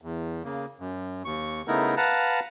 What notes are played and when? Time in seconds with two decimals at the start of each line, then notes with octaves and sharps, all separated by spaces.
0.02 E2
0.44 C#3 A#3
0.80 F#2
1.25 D#2 C#6
1.68 C#3 A3 B3 D#4 E4 A#4
1.97 B4 F5 F#5 A5 A#5